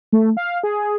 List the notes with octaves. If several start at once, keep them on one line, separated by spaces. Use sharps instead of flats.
A3
F5
G#4